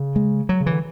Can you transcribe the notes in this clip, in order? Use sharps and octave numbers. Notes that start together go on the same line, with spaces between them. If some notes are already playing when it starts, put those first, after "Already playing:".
Already playing: C#3
G#3
F#3
C#3
E3
D3